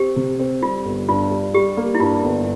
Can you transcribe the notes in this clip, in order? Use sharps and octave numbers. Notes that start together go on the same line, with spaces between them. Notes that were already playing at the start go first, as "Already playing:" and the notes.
Already playing: C4 G4
C3
C4
G3 F4
G1
G2 F4
G3
G3 G4
A#3
E4
G2 F4
G1